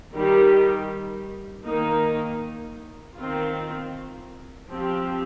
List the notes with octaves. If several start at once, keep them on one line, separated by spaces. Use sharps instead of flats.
D#3 G3 D#4 G4
D#3 A#3 D#4
D#3 C4 F4
F3 C4 G4